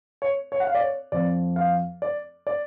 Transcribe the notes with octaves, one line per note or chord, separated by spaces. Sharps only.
C#5
C#5
F#5
F5
D5
C#5
F2 F3 D5
F5
D5
D5